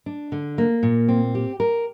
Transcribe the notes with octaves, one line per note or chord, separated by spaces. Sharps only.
D4
D3
A#3
A#2
C4
G4
A#4